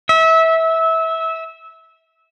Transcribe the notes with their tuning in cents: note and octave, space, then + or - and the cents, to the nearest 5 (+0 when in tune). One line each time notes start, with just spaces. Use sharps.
E5 -20